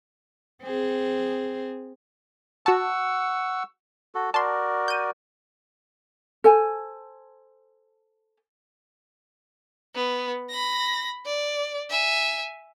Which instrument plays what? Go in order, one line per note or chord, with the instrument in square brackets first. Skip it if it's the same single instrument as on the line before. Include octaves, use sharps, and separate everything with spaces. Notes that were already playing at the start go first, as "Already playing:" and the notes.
[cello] C4 G#4
[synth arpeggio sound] F#4 A5 [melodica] F#5 C#6 E6
[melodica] F#4 A4
[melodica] F#4 A#4 D5 [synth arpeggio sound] A5 C6
[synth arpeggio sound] G6 D#7
[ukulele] A4 C5 G#5
[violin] B3
B5 A#6
D5
E5 G#5